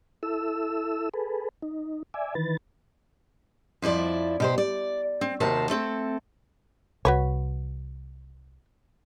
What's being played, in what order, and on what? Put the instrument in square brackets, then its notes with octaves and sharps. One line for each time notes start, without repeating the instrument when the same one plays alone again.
[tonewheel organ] E4 A4 E6
G#4 A4 B4
D#4
D5 E5 G#5
D#3 E3 B4 A6
[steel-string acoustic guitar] F2 F3 E4 D5
B2 G4 C5
D5
C4
D#2 C3 F#4 A#4 C5 A5
A3 C4 A4
[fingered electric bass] C2 [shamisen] F#4 B4 C#5